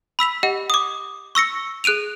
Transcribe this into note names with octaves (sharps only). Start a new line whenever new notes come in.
B5 E6 B6 F7
G4 D#5 F#5
D6 D#6
C#6 E6 A#6 C#7
G#4 F#6 D7 D#7 F7